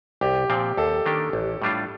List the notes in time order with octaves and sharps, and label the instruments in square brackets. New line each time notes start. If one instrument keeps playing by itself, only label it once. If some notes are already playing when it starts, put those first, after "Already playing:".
[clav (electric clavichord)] C2 [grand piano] G4
[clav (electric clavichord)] A#2 F3 C4
[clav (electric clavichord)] D#2 [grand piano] A4
[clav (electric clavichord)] D#3 A#3 D4 G4
A1
A2 G3 D4 F4